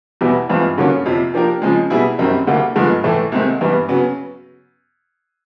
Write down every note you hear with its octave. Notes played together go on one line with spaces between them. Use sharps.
E2 B2 G3 B3 E4
G2 E3 G#3 C4 F4
G2 D3 F#3 A#3 C#4
F2 C3 F3
F3 A#3 D4 G4 A#4
C#3 F3 G#3
B2 G3 B3 E4 G#4
F#2 D#3 G3 C4
D2 D3 G3 A#3
G2 D3 F3 G#3 B3
A2 E3 A3
C2 C3 D#3 G#3 C4
G2 E3 G3 B3
C#3 F#3 B3